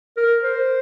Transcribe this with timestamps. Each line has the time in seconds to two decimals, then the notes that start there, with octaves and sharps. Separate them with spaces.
0.17 A#4
0.43 C5